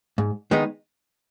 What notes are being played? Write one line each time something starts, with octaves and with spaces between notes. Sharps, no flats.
G#2
D#3 G#3 B3 D#4